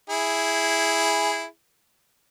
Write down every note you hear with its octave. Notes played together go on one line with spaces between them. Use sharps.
E4 G#4